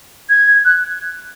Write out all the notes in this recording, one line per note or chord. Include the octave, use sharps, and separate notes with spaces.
G#6
F#6